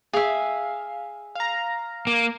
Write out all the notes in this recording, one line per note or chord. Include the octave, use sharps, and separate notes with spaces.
G#4 E5 F5
F5 A#5
A#3